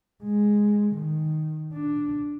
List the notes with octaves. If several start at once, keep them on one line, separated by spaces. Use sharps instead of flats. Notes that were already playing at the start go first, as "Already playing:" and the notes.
G#3
D#3
D4